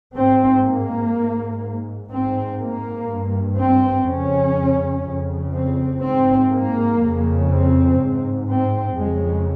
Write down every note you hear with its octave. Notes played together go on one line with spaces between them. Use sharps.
G#2 C4
A#3
G#2
G#2 C4
A#3
G2
C4
F2 C#3 C#4
F2 C#3
C4
G#2 C4
A#3
F2 C#3
C4
G#2
C4
F2 C#3 G#3